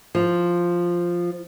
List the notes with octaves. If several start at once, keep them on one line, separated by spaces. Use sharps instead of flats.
F3